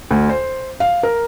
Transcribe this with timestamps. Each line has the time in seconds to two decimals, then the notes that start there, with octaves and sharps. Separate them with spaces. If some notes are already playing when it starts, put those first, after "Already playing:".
0.11 D2
0.29 C5
0.80 F5
1.03 A#4